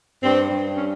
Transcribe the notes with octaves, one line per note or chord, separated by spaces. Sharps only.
G2 C4
G2
C#4